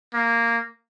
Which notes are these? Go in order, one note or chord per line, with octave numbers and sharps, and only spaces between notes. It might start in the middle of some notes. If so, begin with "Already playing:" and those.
A#3